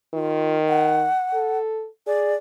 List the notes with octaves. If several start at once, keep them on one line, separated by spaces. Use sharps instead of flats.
D#3 F4
F#5
A4
G#4 D5